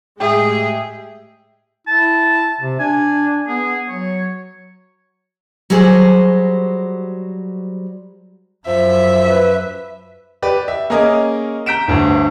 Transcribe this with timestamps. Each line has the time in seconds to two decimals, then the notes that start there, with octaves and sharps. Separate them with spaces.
0.20 A2 G#3 G4 G#4 E5 G5
1.87 E4 A5
2.61 C3
2.80 D4 G#5
3.48 B3 G#4
3.89 F#3 C#5
5.70 F#3 G3 F#4 G#4 C5
8.67 F#2 F3 E5
9.29 B4
10.42 G4 B4 D5
10.68 E5
10.90 A#3 C#4 G#4 A#4 D#5
11.66 A#5 G6 B6 D7 E7
11.88 G1 D2 G2